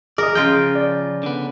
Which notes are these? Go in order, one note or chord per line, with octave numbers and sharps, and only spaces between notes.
G#4 A#4 D5 D#5
C#3 F3 F4 G5 G6 D7
D5
D3 B3